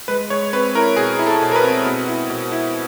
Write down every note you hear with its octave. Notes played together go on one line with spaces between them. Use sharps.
G#3 B4
G#3 C#5
C4 B4
E4 A#4
B2 G#4
E4
A4
B2
A#4
B4
C4
B2
E4
B2
E4